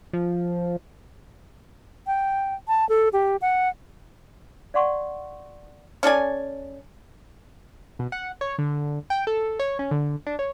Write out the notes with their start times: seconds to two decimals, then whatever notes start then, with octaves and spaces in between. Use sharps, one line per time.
0.13 F3
2.07 G5
2.68 A5
2.89 A4
3.13 G4
3.42 F#5
4.74 D5 F5 F#5 C6 C#6
6.03 C#4 A4 D5 G#5
7.99 B2
8.12 F#5
8.41 C#5
8.59 D3
9.10 G5
9.27 A4
9.59 C#5
9.79 C#4
9.91 D3
10.27 D4
10.39 C#5